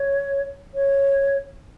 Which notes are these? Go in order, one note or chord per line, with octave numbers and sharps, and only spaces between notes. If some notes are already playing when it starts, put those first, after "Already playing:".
Already playing: C#5
C#5